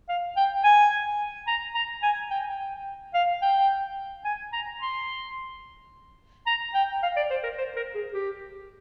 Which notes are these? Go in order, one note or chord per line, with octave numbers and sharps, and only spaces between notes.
F5
G5
G#5
A#5
A#5
G#5
G5
G5
F5
G5
G#5
A#5
C6
A#5
G5
F5
D5
C5
A#4
C5
A#4
G#4
G4